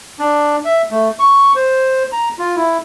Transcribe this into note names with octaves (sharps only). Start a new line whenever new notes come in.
D4
E5
A3
C#6
C5
A#5
F4
E4